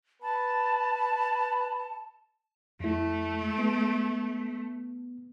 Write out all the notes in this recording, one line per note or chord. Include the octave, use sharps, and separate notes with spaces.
B4 A5
F2 A3 E4
B3